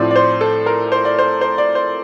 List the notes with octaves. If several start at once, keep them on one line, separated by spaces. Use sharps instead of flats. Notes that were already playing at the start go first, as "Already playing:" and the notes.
Already playing: A2 F3 C4 D5
D5
C5
A4
A#4
C5
D5
C5
C5
D5
C5